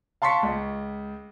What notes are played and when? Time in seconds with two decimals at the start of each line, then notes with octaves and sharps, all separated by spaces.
0.22 F5 A5 C6 C#6 B6 C#7
0.43 C#2